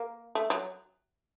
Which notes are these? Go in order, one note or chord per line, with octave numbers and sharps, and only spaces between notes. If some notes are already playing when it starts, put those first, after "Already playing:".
Already playing: A#3
A3
F#3